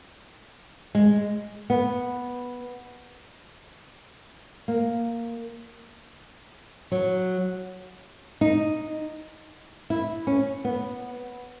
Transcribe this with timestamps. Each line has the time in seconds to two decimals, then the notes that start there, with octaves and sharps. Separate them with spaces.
0.95 G#3
1.70 B3
4.68 A#3
6.92 F#3
8.41 D#4
9.90 E4
10.27 C#4
10.65 B3